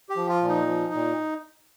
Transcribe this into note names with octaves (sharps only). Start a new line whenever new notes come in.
G4
F3
F4
A#2
D#4
F3
A#2